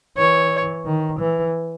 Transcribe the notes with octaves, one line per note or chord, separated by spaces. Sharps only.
E3 C#5
D#3
E3